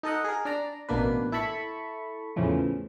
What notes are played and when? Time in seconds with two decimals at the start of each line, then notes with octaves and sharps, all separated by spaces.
0.03 D#4 A4 D#5 F#5
0.24 G#4 A#4
0.45 D4 D5 A#5
0.89 A1 B2 A#3 D4 B4
1.32 E4 A4 A5 B5 C#6
2.36 E2 A2 C#3 E3 F3